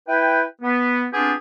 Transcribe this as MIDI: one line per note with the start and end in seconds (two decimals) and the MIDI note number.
0.08 0.43 64
0.08 0.43 71
0.08 0.43 79
0.62 1.05 59
1.13 1.32 59
1.13 1.32 60
1.13 1.32 62
1.13 1.32 65
1.13 1.32 67
1.13 1.32 68